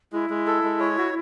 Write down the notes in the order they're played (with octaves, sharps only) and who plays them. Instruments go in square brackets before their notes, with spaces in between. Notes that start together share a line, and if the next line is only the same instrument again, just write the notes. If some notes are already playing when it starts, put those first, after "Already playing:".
[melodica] G#3 [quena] E4
[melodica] G#3
A4
G#3
C#5
F#4